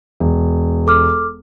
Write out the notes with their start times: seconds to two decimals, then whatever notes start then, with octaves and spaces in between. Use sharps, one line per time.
0.20 E1
0.87 A4 D6 F6